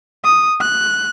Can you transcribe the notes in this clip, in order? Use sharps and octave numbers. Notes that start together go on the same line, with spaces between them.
D#6
F#6